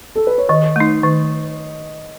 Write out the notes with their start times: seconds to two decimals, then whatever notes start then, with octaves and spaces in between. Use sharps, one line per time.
0.16 A4
0.27 B4
0.38 C#5
0.49 D#3 D#5
0.76 A3 D#4
1.03 D#3